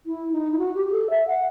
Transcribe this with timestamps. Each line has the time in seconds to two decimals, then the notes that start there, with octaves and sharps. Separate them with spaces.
0.06 E4
0.32 D#4
0.51 E4
0.58 F#4
0.75 G4
0.87 G4
0.92 A4
1.10 E5
1.27 F#5